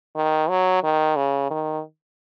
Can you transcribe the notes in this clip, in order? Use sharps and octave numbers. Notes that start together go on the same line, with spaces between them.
D#3
F#3
D#3
C#3
D#3